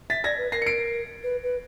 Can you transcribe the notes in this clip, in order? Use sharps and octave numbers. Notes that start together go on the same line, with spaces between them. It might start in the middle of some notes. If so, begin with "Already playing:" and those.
E5 A6 B6
D5 G#6 A#6
B4
A#4 A#6 C7
C#7
C7 D7
B4
B4